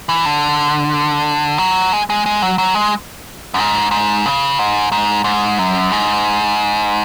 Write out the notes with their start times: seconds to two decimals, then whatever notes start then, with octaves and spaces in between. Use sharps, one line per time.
0.09 E3
0.26 D3
1.58 F#3
1.93 G#3
2.10 G#3
2.26 G#3
2.42 F#3
2.58 F#3
2.75 G#3
3.54 F#2
3.58 G#2
3.91 G#2
4.26 C#3
4.59 G#2
4.92 G#2
5.24 G#2
5.59 F#2
5.92 G#2